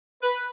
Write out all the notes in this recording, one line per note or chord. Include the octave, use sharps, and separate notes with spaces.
B4